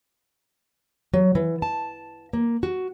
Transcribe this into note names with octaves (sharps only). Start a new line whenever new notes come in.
F#3
E3
A5
A#3
F#4